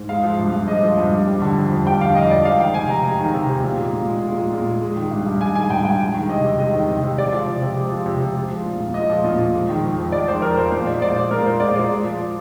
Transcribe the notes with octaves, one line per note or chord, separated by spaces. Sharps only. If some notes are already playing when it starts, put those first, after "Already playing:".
Already playing: G#2
G#3 F5
F3
G2
G2
G#3 D#5
F3
G2
G2
G3
D3
F2
F2
G3 G5
D3 F5
F2 D#5
F2 D5
G#3 F5
D#3 G5
C3 G#5
C3 A#5
G#3 A#5
D#3
C3
C3
A#2
G#3
A#2
G#3
A#2
G#3
A#2
G#3
G#3
D#3
G2
G2
G#3 G#5
D#3 G#5
G2 G5
G2 G5
G#3
D#3
C3 D#5
C3
G#3 D#5
D#3
C3
C3
G#3 D5
F3
C3
C3
G#3
F3
C3
C3
G#3
F3
A#2
A#2
G#3 D#5
F3
A#2
A#2
G#3
D#3
F2
F2
G#3 D5
D#3 C5
F2 A#4
F2 C5
A#2 C5
G#3 D5
A#2 D5
G#3 C5
A#2 A#4
G#3 C5
A#2 D5
G#3 D5
G#3
F3